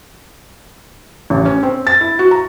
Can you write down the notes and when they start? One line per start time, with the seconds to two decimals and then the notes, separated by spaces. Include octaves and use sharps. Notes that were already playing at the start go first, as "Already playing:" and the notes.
1.30 A1
1.45 C#4
1.63 C4
1.87 A6
2.01 E4
2.19 F#4
2.31 A#5